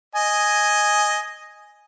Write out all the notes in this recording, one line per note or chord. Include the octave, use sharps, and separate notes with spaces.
D#5 G#5